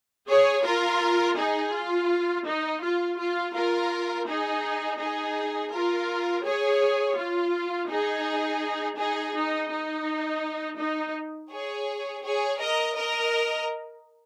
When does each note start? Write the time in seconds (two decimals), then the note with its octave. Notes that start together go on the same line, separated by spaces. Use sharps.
0.29 G#4 C#5
0.65 F4 A#4
1.38 D#4 G#4
1.73 F4
2.46 D#4
2.82 F4
3.19 F4
3.54 F4 A#4
4.27 D#4 G#4
4.99 D#4 G#4
5.72 F4 A#4
6.45 G#4 C#5
7.17 F4
7.90 D#4 G#4
8.98 D#4 G#4
9.35 D#4
9.71 D#4
10.79 D#4
11.51 G#4 C#5
12.24 G#4 C#5
12.60 A#4 D#5
12.96 A#4 D#5